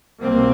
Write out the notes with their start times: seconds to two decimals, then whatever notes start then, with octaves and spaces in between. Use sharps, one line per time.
0.22 C2 B2 A#3 C4